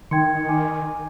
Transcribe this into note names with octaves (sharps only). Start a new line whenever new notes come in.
D#3 G5 C6 G#6 C#7
G#5 D6